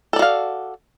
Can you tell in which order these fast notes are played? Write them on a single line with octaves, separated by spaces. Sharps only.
A4 D5 F#4 F5